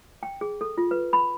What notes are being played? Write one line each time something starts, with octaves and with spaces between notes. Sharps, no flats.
G5
G#4
A4
F4
B4
B5